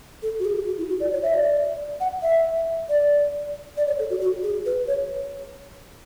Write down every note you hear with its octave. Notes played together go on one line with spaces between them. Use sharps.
A4
F#4
G#4
F#4
E4
F#4
D5
C#5
E5
D5
F#5
E5
D5
D5
C#5
A4
F#4
F#4
G#4
B4
C#5